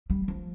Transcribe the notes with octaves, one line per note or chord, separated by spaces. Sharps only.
G3
F3